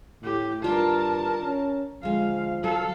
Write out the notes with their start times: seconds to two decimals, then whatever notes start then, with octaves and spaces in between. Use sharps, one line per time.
0.23 A2 G4
0.64 G2 F4 A#4 D5 A5
1.42 C#4
2.03 D2 F3 G#3 F5
2.64 F#3 A4 F5